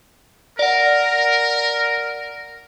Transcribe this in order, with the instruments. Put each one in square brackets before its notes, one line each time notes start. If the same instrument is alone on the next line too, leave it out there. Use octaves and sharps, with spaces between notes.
[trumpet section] A#4 [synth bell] D5 F#5